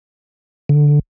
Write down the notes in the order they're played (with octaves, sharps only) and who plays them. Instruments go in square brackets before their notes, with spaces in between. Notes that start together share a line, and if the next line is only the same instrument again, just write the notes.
[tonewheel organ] D3